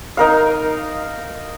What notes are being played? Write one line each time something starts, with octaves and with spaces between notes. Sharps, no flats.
D#4 A#4 F5